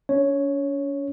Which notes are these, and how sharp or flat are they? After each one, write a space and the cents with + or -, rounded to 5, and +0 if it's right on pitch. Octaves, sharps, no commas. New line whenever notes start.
C#4 +40 C#5 +0